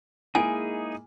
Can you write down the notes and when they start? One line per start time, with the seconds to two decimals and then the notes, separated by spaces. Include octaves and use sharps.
0.35 G#3 A#3 D#4 E4 G#4 G#5